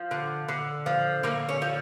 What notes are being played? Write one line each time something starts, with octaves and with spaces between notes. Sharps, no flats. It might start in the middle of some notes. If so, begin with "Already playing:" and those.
Already playing: F3
D3
D3
F3
D3 A#3
C#4
F3